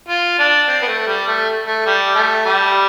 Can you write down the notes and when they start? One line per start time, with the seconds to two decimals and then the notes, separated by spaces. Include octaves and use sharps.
0.08 F4
0.39 D4
0.68 C4
0.82 B3
0.87 A3
1.07 G3
1.27 A3
1.67 A3
1.86 G3
2.15 A3
2.46 G3